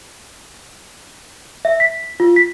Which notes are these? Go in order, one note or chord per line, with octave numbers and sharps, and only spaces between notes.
E5
B6
F4
B6